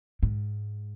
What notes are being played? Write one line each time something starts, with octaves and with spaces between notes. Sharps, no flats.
G#2